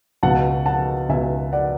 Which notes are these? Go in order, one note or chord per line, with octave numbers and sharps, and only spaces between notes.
C#2 B2 F#5 A5
F#5 A5
C#2 B2 E5 G#5
D5 F#5